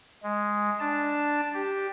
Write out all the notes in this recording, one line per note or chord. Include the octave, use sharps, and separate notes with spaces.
G#3
D4 A5
G4